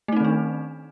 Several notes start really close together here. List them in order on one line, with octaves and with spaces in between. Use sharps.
A3 D#4 C4 D#3 D4